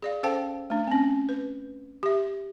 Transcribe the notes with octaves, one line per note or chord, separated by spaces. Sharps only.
G#4 D5 F5
C#4 A4 C5 F5 G5 A5
A3 D4
C4 C#4
B4
G4 E5